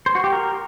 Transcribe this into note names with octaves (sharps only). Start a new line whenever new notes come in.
C5
F#4
G4
A#4